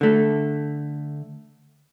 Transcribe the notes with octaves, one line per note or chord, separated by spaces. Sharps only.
D3 A3